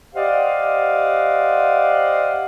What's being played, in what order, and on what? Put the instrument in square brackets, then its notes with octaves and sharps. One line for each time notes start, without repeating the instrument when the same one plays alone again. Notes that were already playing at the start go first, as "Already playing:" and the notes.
[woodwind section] G4 C5 D5 D#5 F5 F#5